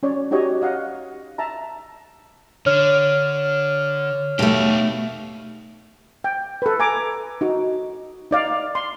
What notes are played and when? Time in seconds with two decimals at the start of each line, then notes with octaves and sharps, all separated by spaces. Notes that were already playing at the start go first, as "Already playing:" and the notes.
0.03 C#4 C#5 D5
0.31 D#4 F#4 G4 C#5 D#5
0.62 D#5 F5 F#5
1.38 E5 A5 A#5
2.66 D3 C#5 F6
4.39 B2 A3 D#4 G4
6.24 G5
6.62 A4 B4
6.80 G#5 A#5 D6
7.41 D#4 F#4
8.31 D#4 D5 F5
8.75 C6